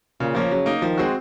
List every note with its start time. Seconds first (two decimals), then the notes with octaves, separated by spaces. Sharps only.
0.20 A#2 C#3
0.35 F3 A#3 C#4
0.51 C#3 F#3
0.66 A#3 D#4
0.82 D#3 F3
0.98 G#3 C4 F#4